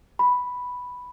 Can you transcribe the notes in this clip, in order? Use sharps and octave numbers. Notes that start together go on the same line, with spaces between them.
B5